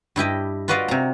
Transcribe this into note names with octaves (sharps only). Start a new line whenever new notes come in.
G2 E4 G4 D#5
F4 F#4 B4 D5 D#5 F5
C3 A#5